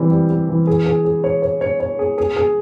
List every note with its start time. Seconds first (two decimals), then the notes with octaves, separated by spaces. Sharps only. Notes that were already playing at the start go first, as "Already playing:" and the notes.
Already playing: E3 G3 C4
0.11 G3
0.30 G3
0.49 E3
0.67 G#4
0.86 G#4
1.05 G#4
1.24 C#5
1.42 C#5
1.61 C#5
1.80 C#5
1.99 G#4
2.18 G#4
2.36 G#4